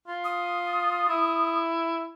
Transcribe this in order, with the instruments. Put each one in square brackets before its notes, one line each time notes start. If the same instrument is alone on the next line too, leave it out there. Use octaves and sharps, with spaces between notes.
[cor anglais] F4
[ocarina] D#6
[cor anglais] E4